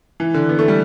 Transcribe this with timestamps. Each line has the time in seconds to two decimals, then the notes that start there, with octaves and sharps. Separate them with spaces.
0.20 E3
0.34 D3
0.49 B3
0.59 A3
0.68 G3